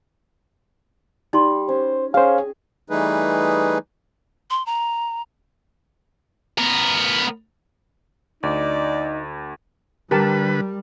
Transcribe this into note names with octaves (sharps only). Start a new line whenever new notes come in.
G3 D#4 C6
C#4 C5
C#4 G#4 C5 F5
E3 G3 A3 D#4 G#4 B4
C6
A#5
B3 A#4
D2 D#4 D5
D3 G3 G4 A#4 B4 A5